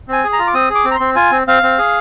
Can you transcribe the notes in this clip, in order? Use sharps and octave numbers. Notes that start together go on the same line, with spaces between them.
C4 G#5
G#4
A#5
F4
D6
C4 D#6
G#4
D6
C4
A#5
C4 C6
F4 G#5
C4
C4 F5
C4
G#4